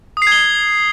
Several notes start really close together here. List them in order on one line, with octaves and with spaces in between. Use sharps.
D#6 C7 G#6 G7